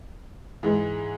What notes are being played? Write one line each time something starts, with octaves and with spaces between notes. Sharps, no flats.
G#2 E3 G#3